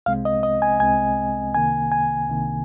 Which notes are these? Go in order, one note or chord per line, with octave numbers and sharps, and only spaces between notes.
C2 C3 G#3 C4 F5
D#5
D#5
G#5
C2 C3 G#3 C4 G#5
C2 C3 D#3 A#3 G#5
G#5
C2 C3 D#3 A#3